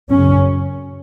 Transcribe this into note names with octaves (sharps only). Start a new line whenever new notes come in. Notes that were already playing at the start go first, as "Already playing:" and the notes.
F#2 C#3 C#4